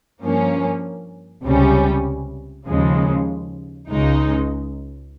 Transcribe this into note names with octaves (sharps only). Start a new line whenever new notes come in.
G2 F3 A#3 C#4
C#2 C3 G3 C#4
D#2 C#3 F3 G#3
C#2 C#3 G#3 D#4